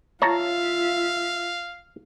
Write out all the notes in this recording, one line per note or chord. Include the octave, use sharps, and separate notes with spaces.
F4 C#5 E5 F5 A5 A#5